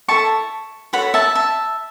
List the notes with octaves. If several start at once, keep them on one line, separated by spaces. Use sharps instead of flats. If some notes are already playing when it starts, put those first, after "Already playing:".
E4 A4 C#5 A5 C#6
F#4 A4 C#5 F#5 B5
E5 A5
E5 A5